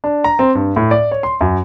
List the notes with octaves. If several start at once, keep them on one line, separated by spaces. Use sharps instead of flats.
D4
A#5
C4
G2
A2
D5
C#5
C6
F#2